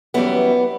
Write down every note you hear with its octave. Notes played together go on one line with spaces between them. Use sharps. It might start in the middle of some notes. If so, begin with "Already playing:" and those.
F#2 E3 G3 B3